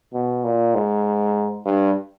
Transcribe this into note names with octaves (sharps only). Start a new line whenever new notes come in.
B2
A#2
G#2
G2